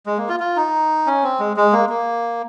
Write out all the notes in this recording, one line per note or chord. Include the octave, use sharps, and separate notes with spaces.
G#3
A#3
F4
F4
D#4
C#4
C4
G#3
G#3
A#3
A#3